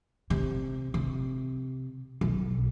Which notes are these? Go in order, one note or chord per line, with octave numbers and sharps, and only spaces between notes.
C3
C3
B1